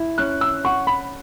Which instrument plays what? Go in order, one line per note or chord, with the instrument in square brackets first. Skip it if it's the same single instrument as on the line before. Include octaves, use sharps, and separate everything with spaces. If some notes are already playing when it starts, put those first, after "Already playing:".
Already playing: [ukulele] E4
[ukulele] C#4 [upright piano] F#6
[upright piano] E6
[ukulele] F#5 [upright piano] C#6
[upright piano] B5